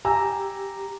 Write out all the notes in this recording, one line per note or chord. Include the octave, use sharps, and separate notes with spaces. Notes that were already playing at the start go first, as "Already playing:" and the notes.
G4 G#5 A#5 E6